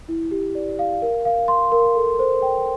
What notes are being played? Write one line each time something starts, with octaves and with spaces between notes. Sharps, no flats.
E4
G4
D5
F5
A#4
F5
C6
A#4
A4
C5
G5